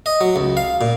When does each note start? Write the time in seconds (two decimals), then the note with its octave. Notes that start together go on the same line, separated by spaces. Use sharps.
0.06 D#5
0.21 F#3
0.36 C#2
0.57 F5
0.81 A#2